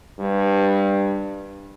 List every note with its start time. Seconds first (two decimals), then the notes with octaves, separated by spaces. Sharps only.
0.20 G2